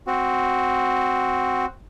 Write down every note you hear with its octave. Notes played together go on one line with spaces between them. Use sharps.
C4 F#4